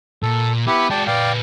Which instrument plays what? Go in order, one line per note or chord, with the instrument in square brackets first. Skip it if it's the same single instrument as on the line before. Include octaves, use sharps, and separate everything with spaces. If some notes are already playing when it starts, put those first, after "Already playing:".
[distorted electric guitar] A#2 [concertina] A4
[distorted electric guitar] B3 [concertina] E4 G4
[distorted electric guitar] G#3 F#4 [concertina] D5 G5 A5
[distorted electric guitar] A#2 B4 [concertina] D5 F5 G5